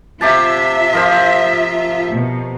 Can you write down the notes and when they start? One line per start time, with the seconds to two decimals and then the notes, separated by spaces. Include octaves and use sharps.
0.21 C3 F4 G4 E5 A5
0.93 F3 A#4 C5
2.12 B2